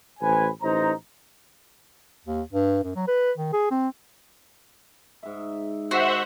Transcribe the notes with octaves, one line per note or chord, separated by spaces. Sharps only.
A1 B4 C5 G#5
A1 D#4 C5 A#5
D#2
G2
F#2
F#3
B4
D#3
G#4
C4
G#2 E5
D#3 F#4 C5 E5 F#5